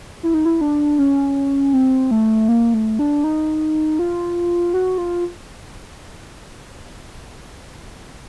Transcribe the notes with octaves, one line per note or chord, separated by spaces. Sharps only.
E4
D#4
E4
D4
C#4
C4
A3
A#3
A3
D4
D#4
F4
F#4
F4